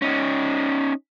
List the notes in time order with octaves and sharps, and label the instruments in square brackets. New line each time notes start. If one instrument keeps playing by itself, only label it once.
[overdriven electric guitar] C#4 D#4